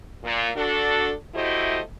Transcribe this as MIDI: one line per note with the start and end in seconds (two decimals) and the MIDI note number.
0.24 0.49 46
0.55 1.13 62
0.55 1.13 66
0.55 1.13 69
1.35 1.80 57
1.35 1.80 64
1.35 1.80 66
1.35 1.80 67
1.35 1.80 72
1.35 1.80 75